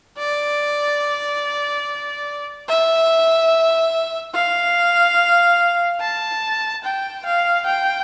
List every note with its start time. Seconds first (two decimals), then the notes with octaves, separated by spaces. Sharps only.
0.18 D5
2.69 E5
4.34 F5
6.00 A5
6.84 G5
7.26 F5
7.66 G5